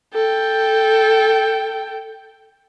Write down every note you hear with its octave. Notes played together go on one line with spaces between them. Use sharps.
A4 G5